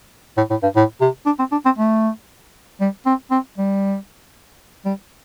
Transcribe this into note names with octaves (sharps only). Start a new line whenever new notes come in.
A2
A2
G2
A2
C3
D4
C4
D4
C4
A3
G3
C4
C4
G3
G3